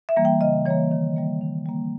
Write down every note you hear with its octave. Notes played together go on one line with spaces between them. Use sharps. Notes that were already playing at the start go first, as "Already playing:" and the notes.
E5
E3 G3 A#3
G5
C#3 D#5
E3 G3 A#3 C#5
D#3
G3 A#3
D#3
G3 A#3